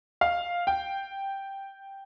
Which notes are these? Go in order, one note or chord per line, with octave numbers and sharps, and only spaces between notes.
F5
G5